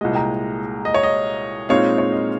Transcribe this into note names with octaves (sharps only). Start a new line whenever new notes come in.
C2 A#2 G#3 D#5
G5 A#5
D#5
C#5
D#5
A#2 G#3 C4 D#4 C#5 F5
C#5
D#5